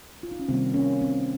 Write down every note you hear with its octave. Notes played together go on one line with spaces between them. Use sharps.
F4
D#4
C#4
C3 D#3 G3 A#3 C4
A#3 C#4
C4